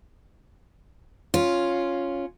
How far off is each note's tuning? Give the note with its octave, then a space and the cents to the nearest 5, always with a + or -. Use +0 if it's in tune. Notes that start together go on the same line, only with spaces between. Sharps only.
C#4 +0 F4 +0